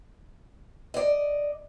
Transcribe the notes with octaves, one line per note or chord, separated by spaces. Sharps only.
D5 D#5